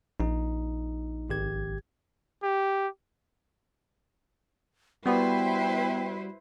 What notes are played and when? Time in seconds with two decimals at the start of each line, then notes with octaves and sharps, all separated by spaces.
0.20 A#1 D#4
1.30 G#1 G4 G#6
2.43 G4
5.06 G3 B3 E4 F#4 B4 C5 D5 G5